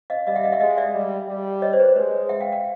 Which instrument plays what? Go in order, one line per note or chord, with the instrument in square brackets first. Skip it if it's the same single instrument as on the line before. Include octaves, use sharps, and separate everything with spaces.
[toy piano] D#5 F5
[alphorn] G3 [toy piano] D#5 F5
[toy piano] E5 F#5
D#5 F5
E5 F#5
[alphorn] G#3 [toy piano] D#5 F5
[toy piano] D5 E5
[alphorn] G3
G3
[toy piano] C#5 D#5
C5 D5
B4
C5
[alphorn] G#3 [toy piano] B4 C#5
[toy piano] E5 F#5
F5 G5
F5 G5